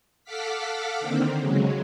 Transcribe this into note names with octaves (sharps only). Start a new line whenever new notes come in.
A4 F5 F#5 D6 F6 B6
D3 D#3 A#3 C4
C#3 F#3 G#3